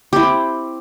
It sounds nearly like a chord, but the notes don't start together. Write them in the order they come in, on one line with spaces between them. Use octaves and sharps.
G4 E4 C5 C4